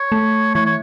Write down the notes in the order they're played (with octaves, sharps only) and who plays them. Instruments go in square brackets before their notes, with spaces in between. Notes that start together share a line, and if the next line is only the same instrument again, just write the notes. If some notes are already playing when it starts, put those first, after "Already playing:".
Already playing: [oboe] C#5
[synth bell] A3
[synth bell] E3 [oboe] C#5
[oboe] C#5